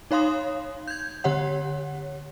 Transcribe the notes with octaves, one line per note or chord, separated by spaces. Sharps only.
D#4 C#5 F5 C6 D#6
G6 G#6
D3 G4 C#5 F#5